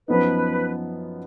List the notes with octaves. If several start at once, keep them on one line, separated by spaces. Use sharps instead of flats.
F#2 F3 B3 D#4 B4